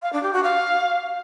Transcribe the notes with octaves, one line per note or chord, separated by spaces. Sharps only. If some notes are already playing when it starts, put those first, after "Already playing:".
F5
D4
G4
F#4
F5